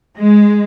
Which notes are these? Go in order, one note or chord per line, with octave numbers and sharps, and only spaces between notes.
G#3